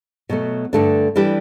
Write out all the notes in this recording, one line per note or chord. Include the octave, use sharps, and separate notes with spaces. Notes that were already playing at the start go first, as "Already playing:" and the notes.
B2 F#3 A3
G2 D3 A3 D4
E3 G3 D4 G4